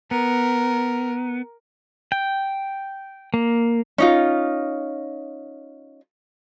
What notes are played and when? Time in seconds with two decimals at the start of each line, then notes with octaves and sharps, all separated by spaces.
0.11 B3 A#4
2.12 G5
3.34 A#3
3.98 C#4 D#4 F4